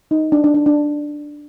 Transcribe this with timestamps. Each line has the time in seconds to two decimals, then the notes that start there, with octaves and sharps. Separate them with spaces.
0.11 D#4
0.32 D4
0.44 D4
0.54 D4
0.66 D4